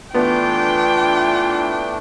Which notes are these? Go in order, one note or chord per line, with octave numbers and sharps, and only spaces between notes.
E3 A3 B3 D4 F4 G5